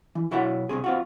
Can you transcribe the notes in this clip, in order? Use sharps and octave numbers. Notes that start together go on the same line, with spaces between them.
E3
B1 E4 F#4 C#5 E5 F#5
C2 G2 C4 G#4
C4 F4 F#4